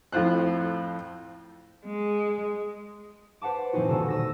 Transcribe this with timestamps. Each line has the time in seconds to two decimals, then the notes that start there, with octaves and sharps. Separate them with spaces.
0.12 F2 A2 F4 C5 F#6
1.86 G#3
3.41 B4 C5 F#5 A5 D6
3.73 A#2 E3 C4 C#4 D#4 F#4
3.88 D#1 B2 D3 A4 E6
4.08 D#6 E6 A#6